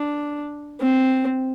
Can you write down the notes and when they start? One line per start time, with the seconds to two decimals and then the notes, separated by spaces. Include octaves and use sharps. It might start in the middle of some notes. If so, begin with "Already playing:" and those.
Already playing: D4
0.80 C4